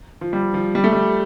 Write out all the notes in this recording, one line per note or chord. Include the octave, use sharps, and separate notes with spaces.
F3
G3
F3
G3
A3
G3